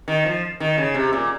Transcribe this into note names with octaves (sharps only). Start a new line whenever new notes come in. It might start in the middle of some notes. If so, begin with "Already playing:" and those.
D#3
F3
D#3
C#3
C3
A#2